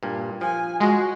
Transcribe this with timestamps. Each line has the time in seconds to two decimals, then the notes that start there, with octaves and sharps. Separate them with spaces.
0.03 G2 A#2
0.41 F3 G#5
0.80 G#3 F#4